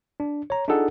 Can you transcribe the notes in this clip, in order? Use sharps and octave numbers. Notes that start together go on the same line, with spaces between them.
D4
C#5 A#5
D4 D#4 F4 G#4 A4 F#5